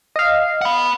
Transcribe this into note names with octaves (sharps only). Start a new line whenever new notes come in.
D#5 F5
F#5 B5